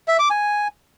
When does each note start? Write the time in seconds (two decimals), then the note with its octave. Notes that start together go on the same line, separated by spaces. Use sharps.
0.08 E5
0.19 D6
0.30 G#5